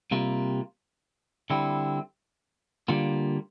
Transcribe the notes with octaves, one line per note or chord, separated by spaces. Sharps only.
C3 G3 A#3 F4
D3 G3 C4 E4
D3 G3 A#3 F4